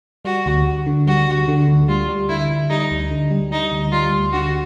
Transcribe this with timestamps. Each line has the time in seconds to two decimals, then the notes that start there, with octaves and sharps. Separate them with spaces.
0.25 G3 F#4
0.46 D2
0.67 D2
0.86 D3
1.07 G3 F#4
1.27 D2
1.48 D3
1.68 D2
1.88 G3 F4
2.08 G3
2.29 D3 E4
2.50 D3
2.70 G3 D#4
2.91 D2
3.11 D3
3.31 G3
3.51 G3 D#4
3.72 D2
3.92 G3 F4
4.12 D2
4.33 D3 F#4